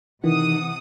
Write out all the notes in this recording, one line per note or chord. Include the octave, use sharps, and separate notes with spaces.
C3 D#3 E3 F#5 D#6